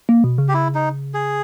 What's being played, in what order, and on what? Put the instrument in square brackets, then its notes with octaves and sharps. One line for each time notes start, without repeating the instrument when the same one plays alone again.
[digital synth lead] A#3
B2
C#3
[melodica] G4
E4
D#4
G#4